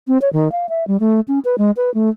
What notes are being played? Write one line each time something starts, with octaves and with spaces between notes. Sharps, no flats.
C4
C#5
D#3
F5
E5
G3
A3
C#4
B4
G#3
B4
A3